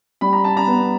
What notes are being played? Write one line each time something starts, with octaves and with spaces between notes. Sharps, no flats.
G3 B5
A#5
A5
A#5
B3